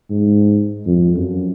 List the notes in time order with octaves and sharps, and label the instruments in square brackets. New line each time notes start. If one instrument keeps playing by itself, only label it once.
[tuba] G#2
F2
F#2